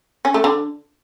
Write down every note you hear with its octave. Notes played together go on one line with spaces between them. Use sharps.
C#4
A3
D3